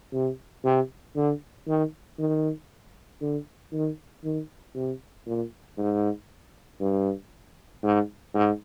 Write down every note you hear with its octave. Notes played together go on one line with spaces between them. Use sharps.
C3
C3
D3
D#3
D#3
D3
D#3
D#3
C3
A#2
G#2
G2
G#2
G#2